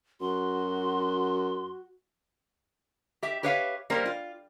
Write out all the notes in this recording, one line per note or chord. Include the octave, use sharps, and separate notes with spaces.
F#2 F#4 C6
G4 E5
G4 B4 C#5 E5 F5
G3 A#3 A#4 C5
F4